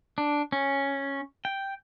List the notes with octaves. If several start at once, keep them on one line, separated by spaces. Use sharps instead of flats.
D4
C#4
G5